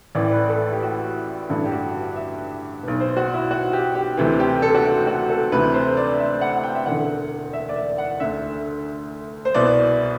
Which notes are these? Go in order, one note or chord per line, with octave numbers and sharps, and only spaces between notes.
A1 A2 E3 D5
B4
A4
G4
F#4
A1 G2 D3 E4
G4
F#4
E5
B1 B2
C5
F#4
E4
F#4
G4
G4
D2 C3 E3
G4
A4
F#4
G4
F#4
A4
D2 C3 E3 B4
C5
D5
E5
F#5
F#5
G5
E5
E1 E2 D3 F#5
E5
D5
E5
F#5
D2 D3 E5
C5
C2 B2 D5